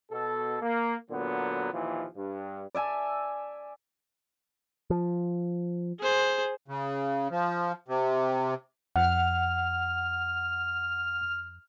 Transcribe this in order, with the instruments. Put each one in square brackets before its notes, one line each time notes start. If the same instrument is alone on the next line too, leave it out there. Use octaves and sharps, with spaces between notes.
[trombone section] B2 A4
A#3
A#2 D3 F#3 B3
D#2 A#2 E3 F3
G2
[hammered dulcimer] D5 E5 G#5 A5
[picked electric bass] F3
[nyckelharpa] G#4 C5
[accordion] C#3
F3
C3
[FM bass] F2 [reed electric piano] F#5 [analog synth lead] F6